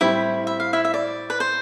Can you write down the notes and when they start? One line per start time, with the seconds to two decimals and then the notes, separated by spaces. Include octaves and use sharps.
0.01 A2 G3 C4 E4 G4 E5
0.47 E5
0.60 F5
0.73 E4 E5
0.85 E5
0.94 D5
1.30 B4
1.40 C5